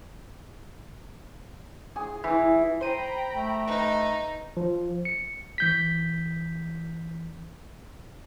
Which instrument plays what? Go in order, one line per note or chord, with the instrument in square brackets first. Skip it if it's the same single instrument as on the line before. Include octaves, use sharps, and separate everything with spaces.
[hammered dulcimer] G#4
E3
[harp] C5 D#7 [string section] G5 A#5 B5
[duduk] A3
[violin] D#4 [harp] B4
[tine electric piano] F3
C#7
E3 G6 B6